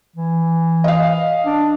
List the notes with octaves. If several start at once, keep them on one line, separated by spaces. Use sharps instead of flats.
E3
D#5 F5
D4